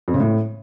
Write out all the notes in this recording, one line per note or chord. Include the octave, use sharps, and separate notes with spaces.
F2
C#3
A2